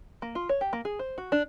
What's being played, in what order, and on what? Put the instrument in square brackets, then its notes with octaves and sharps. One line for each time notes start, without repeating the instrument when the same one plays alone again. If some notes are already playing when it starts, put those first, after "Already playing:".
[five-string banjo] A#3
F4
C#5
G4
A#3
G#4
C5
F#4
D4